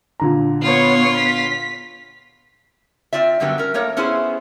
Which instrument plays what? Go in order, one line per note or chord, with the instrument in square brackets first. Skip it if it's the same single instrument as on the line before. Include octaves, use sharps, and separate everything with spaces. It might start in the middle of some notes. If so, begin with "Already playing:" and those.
[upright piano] A#2 D3 A#5
[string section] B3 C#5 [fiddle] F4
[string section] B6
[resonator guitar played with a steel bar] C4 F4 D5 E5
F#2 D3 F#3 G3 B3 G4
C#4 A#4
A3 A#3 A#4 C#5
B3 C#4 E4 G#4 C5 G#5